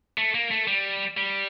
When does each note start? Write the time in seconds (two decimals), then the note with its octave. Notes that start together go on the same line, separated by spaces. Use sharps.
0.18 A3
0.34 A#3
0.51 A3
0.67 G3
1.17 G3